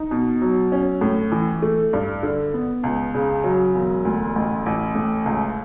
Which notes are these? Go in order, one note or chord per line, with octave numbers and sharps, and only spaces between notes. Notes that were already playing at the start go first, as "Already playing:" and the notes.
Already playing: D#4
B2
F#3
C#4
A2
E3
A3
G2
D3
B3
C#2
C#3
F#3
E1
D2
A1
A1
A2
C#2